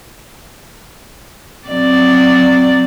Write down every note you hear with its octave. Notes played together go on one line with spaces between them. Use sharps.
F#3 C4 D5